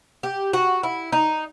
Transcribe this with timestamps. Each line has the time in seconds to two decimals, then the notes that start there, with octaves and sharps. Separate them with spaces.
0.23 G4
0.53 F#4
0.83 E4
1.12 D#4